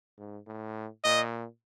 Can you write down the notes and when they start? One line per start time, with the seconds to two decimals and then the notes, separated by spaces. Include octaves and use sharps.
0.18 G#2
0.47 A2
1.04 A#2 D#5